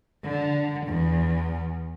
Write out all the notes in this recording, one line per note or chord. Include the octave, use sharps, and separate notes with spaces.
D3
E2